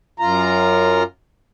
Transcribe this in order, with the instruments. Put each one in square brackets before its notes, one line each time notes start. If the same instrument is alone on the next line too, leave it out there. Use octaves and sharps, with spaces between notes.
[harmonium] F#2 F4 A#5